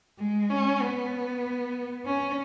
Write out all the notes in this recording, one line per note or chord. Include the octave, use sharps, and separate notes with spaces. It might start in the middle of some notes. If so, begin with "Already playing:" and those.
G#3
C#4
B3
C#4